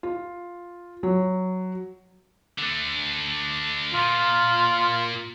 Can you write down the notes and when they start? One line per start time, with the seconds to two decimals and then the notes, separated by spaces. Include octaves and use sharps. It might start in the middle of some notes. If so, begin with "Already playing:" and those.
0.03 F4
1.03 F#3
2.58 D3 A3
3.94 A#2 F4